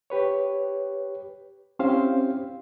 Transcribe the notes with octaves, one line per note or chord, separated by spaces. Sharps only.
G4 B4 C#5
C4 C#4 E4 G4 C5 F5